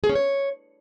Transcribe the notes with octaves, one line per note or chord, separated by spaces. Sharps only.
G#4
C#4
C#5